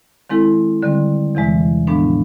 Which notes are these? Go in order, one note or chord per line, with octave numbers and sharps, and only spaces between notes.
D#3 G#3 C4 E4 A4
D3 G3 C4
E2 C3 E3 G#3
A2 F3 G#3 B3 D4